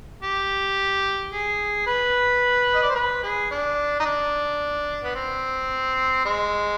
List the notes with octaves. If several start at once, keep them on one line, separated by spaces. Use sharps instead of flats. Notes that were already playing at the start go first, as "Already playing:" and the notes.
G4
G#4
B4
D#5
D5
C5
B4
G#4
D4
D#4
D4
B3
C4
G#3